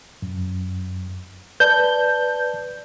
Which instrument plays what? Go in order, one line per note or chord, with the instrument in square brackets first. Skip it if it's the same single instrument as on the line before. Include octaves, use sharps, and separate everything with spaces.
[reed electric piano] F#2
[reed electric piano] B4 D5 A5 [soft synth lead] G6